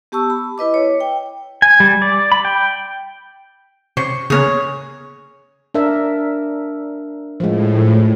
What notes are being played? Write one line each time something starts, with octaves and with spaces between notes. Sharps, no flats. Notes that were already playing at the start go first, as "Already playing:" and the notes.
B3 G4 A5 C#6 E6
B5
E4 B4 D#5 D6
C#5
G5
G#5
G3
D5
B5
G5
C3 C#4 C5 C#6
C#3 A#3 B3 G#4 C#5
D4 A#4 E5
A2 F3 G#3